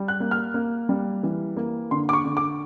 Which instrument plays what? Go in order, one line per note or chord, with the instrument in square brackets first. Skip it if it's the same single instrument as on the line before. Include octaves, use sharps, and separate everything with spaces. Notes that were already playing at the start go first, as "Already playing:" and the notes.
Already playing: [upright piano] G3
F#6
A#3
F6
A#3
G3
E3
A#3
D3 C6
D6
C#6
D3
D6